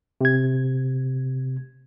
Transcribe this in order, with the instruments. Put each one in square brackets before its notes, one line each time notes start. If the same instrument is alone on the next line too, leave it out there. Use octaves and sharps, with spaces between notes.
[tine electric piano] C3 G#6